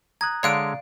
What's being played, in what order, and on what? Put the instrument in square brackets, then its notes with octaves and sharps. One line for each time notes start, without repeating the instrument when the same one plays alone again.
[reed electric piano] A#5 D#6 F#6 [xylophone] G#6
[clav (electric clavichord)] D3 G#3 C#5 [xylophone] D5 F5 D7